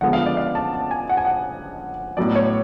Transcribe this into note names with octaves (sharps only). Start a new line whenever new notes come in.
D3 F3 G#3 B3 F#5
F5
D5
F5
A5
A5
G#5
F#5
G#5
F#5
A2 F#3 B3 D5
C#5